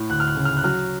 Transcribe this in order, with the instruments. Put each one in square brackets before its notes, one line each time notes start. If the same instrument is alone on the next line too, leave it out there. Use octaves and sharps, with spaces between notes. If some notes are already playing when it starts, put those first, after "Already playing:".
Already playing: [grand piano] A2
D2 F#6
F6
F#6
C#3
F6
F#6
F#3 F6